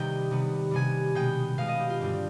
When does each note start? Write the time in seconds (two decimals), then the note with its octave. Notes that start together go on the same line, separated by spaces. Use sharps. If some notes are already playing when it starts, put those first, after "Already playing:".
Already playing: C3 D#3 G3 B3 D#5 G5
0.31 C3 G3 B3
0.71 C3 G3 B3 G#5
1.15 B2 G#3 B3 G5
1.58 B2 G#3 B3 F5
1.68 D#5
1.80 G4
1.90 F4
2.00 G2 D3 G3 C4 G4